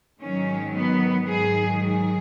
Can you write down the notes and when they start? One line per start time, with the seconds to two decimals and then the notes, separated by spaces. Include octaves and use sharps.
0.20 G#2 D#3 F#3 C#4
0.74 B3
1.27 G#2 D#3 F#3 G#4
1.80 G#4